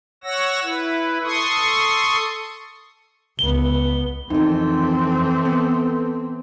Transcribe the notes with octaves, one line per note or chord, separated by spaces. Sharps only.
C#5 F#5 E6 A#6
E4 B4
A4 C6 C#6 D#6
C#2 B3 G7
F2 D#3 E3 C4 D#4 A4
B3